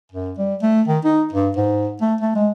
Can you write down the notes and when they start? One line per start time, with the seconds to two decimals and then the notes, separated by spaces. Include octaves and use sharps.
0.12 F#2
0.38 G3
0.62 A3
0.88 D#3
1.05 D#4
1.33 G2
1.56 G#2
2.01 A3
2.21 A3
2.35 G#3